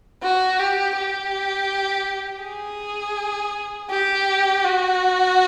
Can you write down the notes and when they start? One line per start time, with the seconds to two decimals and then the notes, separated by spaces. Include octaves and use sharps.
0.23 F#4
0.60 G4
0.96 G4
2.43 G#4
3.90 G4
4.64 F#4